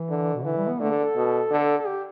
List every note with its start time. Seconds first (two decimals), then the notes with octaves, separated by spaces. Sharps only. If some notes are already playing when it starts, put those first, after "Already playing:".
Already playing: E3
0.10 D3
0.34 B2
0.45 D3 E3
0.57 G3
0.68 B3
0.80 D3 A3
0.92 A4
1.04 A4
1.16 B2
1.51 D3
1.78 A4
1.87 G4